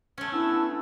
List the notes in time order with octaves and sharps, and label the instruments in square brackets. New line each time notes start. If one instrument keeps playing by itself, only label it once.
[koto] A3 C#4
[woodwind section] B3 D4 [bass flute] E4 [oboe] E6